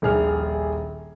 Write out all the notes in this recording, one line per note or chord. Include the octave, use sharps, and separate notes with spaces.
D#1 A#1 G#4 F6